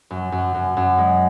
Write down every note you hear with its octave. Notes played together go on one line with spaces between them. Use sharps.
F#2
F#2
F#2
F#2
G#3